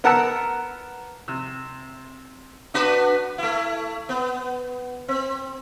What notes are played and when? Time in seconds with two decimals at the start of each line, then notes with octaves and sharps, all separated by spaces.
0.04 B3 A#4 F#5 A5 E6
1.28 C3
2.74 D4 F#4 B4
3.38 A3 E4
4.09 B3
5.08 C4